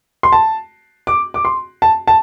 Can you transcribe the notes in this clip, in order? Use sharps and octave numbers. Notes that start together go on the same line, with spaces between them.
C6
A5
D6
D6
C6
A5
A5